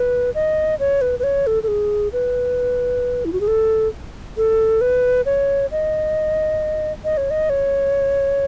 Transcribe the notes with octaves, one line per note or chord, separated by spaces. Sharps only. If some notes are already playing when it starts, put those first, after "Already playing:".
Already playing: B4
D#5
C#5
B4
B4
C#5
A4
A4
G#4
B4
E4
F#4
G#4
A4
A4
B4
C#5
D#5
D#5
C#5
D#5
C#5